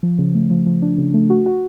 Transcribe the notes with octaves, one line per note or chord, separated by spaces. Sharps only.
F3
C#3
A3
F3
F3
D4
C#3
A3
F#4
F#4